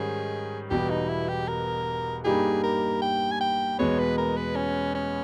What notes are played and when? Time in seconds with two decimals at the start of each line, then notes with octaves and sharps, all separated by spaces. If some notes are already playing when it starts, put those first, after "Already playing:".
Already playing: G#2 D#3 G3 C#4 G#4
0.70 E1 E2 B2 G3 G4
0.90 D#4
1.09 E4
1.28 G4
1.48 A#4
2.24 G2 G3 A#3 D#4 G4 G#4
2.63 A#4
3.02 G5
3.32 G#5
3.41 G5
3.79 E2 B2 G#3 B3 C#5
3.99 B4
4.18 A#4
4.37 B4
4.56 C#4
4.95 C#4